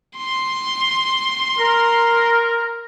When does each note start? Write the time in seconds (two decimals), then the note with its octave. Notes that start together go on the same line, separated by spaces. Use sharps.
0.17 C6
1.59 A#4